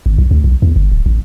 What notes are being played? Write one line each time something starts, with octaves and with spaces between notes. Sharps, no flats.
G#1
B1
D2
B1
E2
G1
D1
A1